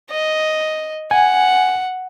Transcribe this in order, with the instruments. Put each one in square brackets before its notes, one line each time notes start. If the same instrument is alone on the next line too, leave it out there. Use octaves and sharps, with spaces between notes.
[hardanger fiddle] D#5
[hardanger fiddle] F#5 [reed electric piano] G#5